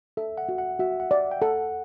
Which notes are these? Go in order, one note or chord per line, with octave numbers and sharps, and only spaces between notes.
A4 E5
F#5
F#4
F#5
F#4 E5
F#5
D5
G5
A4 F#5